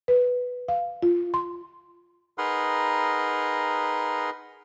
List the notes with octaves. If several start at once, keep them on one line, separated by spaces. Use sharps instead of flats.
B4
F5
F4
C6
D#4 G#4 A#4 B4 F#5 C6